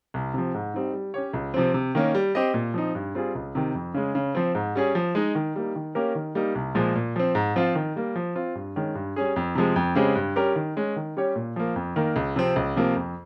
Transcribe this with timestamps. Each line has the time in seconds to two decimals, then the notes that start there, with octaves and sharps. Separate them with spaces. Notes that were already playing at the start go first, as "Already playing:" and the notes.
0.14 C2
0.34 C3 F3
0.54 G#2
0.74 G3 C4 D#4
0.93 G3
1.14 C#4 G4 C#5
1.33 C#2
1.54 C3 F3 C4
1.74 C3
1.95 D#3 A#3 C#4
2.15 G3
2.35 C4 G4 C5 D#5
2.54 A#2
2.74 F3 C4 D#4
2.95 G2
3.15 G3 C4 F4 G#4
3.35 C#2
3.55 C3 D#3
3.75 F2
3.94 C#3 G#3
4.15 C#3
4.35 F3 C4
4.55 G#2
4.75 G3 C#4 G#4
4.95 F3
5.15 G#3 D#4
5.35 D#3
5.56 G3 A#3 D#4
5.76 D#3
5.95 A#3 C#4 G4 A#4
6.15 D#3
6.35 G3 A#3 D#4
6.55 C2
6.75 A#2 F3 G#3
6.95 A#2
7.16 F3 C4
7.35 G#2
7.56 F3 C4 F4
7.75 D#3
7.96 G3 A#3
8.16 F3
8.36 C4 F4
8.55 G2
8.76 D#3 G#3 C#4
8.95 G2
9.16 G3 C#4 G#4
9.36 F2
9.55 C3 F3 G#3
9.76 F2
9.95 C#3 G#3 C4 G4
10.15 G2
10.36 G3 C#4 G4 A#4
10.56 D#3
10.77 G#3 C#4
10.96 D#3
11.17 G3 C#4 G4 C#5
11.36 A#2
11.56 F3 A#3
11.76 F2
11.96 D#3 A#3
12.16 C#2
12.36 C3 F3 C4
12.56 C#2
12.76 C3 F3 A#3
12.96 F2